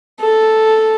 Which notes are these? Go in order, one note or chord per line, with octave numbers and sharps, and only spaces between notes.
A4